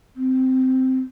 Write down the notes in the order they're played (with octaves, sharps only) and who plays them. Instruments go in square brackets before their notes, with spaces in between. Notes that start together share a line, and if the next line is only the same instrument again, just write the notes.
[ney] C4